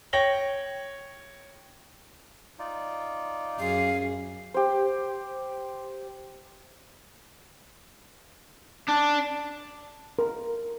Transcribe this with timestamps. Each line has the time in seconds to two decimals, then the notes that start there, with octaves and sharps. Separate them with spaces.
0.13 C#5 G5 A#6 F#7 G7
2.59 D#4 F4 D5
3.59 F#2 G#4 F5
4.54 G4 C5
8.88 D4
10.19 A#4